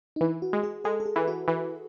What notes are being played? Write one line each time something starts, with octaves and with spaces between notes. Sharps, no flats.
D#4
E3 E4
F#4
G#3
G#4
G#3 A4
A4
G#4
E3
F#4
E3